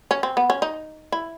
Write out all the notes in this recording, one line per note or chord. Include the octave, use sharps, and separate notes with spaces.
C#4
C4
B3
C#4
D#4
E4